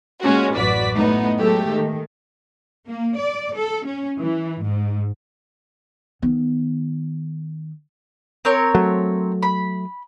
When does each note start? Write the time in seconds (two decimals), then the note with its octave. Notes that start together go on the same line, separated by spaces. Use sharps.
0.21 A#2 G#3 C#4 F#4
0.56 A1 F#2 F#4 B4 D5 B6
0.96 A2 B3 D#4
1.38 F#3 G#3 A3 G4
1.70 D#3
2.87 A#3
3.17 D5
3.56 A4
3.85 C#4
4.18 E3
4.62 G#2
6.22 D#3 B3
8.45 C4 A#4 C#5
8.75 F#3 A3
9.42 B5